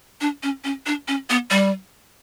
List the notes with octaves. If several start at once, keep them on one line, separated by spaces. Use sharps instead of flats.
D4
C#4
C#4
D4
C#4
B3
G3